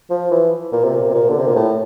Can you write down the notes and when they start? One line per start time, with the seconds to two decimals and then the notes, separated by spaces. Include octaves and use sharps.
0.10 F3
0.31 E3
0.72 A#2
0.84 C3
0.95 A#2
1.09 C3
1.14 A#2
1.30 D3
1.38 C3
1.48 A#2
1.56 A2